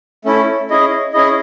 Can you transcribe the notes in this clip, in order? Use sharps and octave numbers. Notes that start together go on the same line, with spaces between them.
A3 C#4 E4
C#4 E4 G#4 D#5
C#4 E4 G#4 D#5